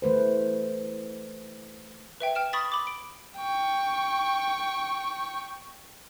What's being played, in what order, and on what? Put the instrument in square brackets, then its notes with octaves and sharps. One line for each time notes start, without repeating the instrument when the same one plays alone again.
[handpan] E3 A3 B4 C5
[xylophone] B4 E5 G5
G5 F6 E7
B5 C#6 D#6 A6 B6
B5 D6
D7
[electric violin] G5 C#6